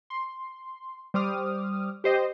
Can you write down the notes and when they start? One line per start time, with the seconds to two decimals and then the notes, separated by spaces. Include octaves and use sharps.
0.10 C6
1.14 G3 C5 D6 D#6 F6
2.04 G4 C5 D#5